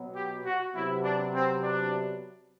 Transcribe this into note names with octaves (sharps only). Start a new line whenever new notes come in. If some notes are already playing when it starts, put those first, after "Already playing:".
Already playing: B2 F#3 B3
G4
F#4
C3 F#3 B3 E4
D4
C4
D4